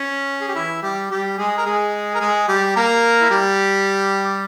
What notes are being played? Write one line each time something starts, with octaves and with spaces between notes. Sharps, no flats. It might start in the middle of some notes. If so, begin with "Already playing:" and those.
Already playing: C#4
G#4
G4
E3 E4
G3 G4
G3 G4
G#3 G#4
A#4
G#3 G#4
A#4
G#3 G#4
G3 G4
A#3 A#4
E4
G3 G4